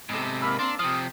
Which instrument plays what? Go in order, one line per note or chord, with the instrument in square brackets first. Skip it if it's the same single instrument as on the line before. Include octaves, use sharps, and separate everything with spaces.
[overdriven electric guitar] G#2 C3 [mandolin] B3 A4
[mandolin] A#3 A#4 E6 [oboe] B5
[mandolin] A#3 C4 A#5 [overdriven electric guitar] D4 [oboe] C6
[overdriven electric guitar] C3 F3 [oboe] D#6 [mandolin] F6